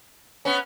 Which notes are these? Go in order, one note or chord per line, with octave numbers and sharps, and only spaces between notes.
B3 C#4